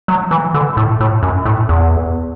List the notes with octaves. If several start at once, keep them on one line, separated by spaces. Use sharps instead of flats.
F#3
E3
D3
A2
A2
F#2
A2
E2